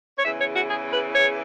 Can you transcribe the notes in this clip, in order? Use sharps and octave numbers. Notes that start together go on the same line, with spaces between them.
C#5
E2 C#3 E3 E5
C#5
F#4
G#4
B4
C#5